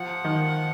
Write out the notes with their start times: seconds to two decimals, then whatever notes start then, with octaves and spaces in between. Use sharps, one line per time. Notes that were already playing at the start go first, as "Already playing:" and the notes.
Already playing: F3 F#5
0.25 D#3